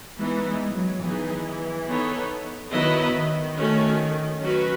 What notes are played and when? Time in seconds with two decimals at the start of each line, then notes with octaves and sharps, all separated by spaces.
0.18 E3 G#3 B3 D#4
0.47 G#3
0.74 F#3
1.03 E3 B3 D#4 G#4
1.87 B3 D#4 A4 C#5
2.72 D#3 F#3 B3 E4 B4 D#5
3.14 D#3
3.56 A3 C#4 F#4
4.41 F#3 C#4 F#4 B4